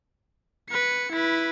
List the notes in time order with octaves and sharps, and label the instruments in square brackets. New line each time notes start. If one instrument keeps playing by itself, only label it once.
[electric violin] B4 C#7
E4 B4